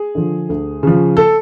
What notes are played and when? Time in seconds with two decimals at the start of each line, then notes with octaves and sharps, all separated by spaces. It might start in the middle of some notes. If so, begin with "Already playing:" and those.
Already playing: G#4
0.15 D3 F3
0.49 D2
0.83 C#3 F3
1.17 A4